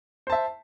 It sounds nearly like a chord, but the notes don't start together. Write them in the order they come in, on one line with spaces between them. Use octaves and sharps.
C5 A5 E5